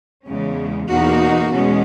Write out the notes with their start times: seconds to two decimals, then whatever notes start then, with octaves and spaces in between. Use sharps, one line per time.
0.25 E2 C#3 G#3 C#4
0.88 E2 B2 A#3 D#4 F#4
1.51 E2 B2 G#3 C#4